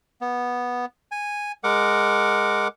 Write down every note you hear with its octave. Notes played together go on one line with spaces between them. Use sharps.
B3
G#5
G#3 A#4 F#5 D6